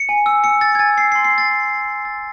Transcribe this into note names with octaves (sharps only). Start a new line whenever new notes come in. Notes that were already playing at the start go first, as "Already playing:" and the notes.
Already playing: C#7
G#5
E6
E6 C#7
E6 A6
G#6
G#5 A6
E6 C7
C6 C7
C7
E6 A6
C6
E6
C6
E6 A6